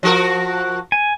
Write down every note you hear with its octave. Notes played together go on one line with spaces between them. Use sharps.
F3 F#4 A#4
G#5